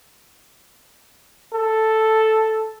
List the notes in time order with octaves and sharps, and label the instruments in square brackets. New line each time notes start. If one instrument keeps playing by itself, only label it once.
[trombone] A4